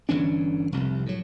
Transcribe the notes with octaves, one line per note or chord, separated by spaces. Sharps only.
G1 E3 C#4 D4
F1 C2
A2 F#3